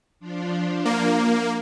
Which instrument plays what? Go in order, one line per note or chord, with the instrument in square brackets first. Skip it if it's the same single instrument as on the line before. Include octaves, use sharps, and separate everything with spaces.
[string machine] F3 D4 F4
[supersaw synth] A#3